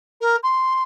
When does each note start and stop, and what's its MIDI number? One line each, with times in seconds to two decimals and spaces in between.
0.21 0.36 70
0.43 0.83 84